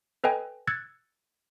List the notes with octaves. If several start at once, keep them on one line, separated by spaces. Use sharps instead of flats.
A4 B4 D#5 G5 G#5
E6 F#6 G#6 A6 C#7